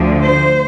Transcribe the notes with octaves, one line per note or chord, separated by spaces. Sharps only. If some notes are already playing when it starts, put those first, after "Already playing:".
Already playing: D2 D3 F3
C5